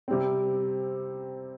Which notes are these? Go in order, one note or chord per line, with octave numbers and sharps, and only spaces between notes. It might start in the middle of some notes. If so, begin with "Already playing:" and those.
C3 G3 C4